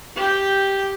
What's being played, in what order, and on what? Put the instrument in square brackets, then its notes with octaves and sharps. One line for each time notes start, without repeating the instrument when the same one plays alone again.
[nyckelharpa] G4 G5